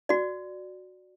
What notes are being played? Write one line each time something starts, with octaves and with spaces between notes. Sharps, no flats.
F#4 D5